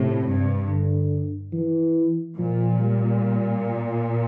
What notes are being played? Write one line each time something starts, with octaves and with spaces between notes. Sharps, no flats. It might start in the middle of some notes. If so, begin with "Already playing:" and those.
Already playing: A2 C3
G2
D3
E3
A#2 F3
G3